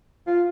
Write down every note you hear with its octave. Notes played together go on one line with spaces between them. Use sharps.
F4